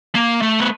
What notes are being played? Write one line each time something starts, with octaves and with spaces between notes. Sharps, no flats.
A#3
A3
B3